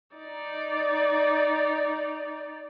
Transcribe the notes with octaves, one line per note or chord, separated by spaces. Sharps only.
D#4 D5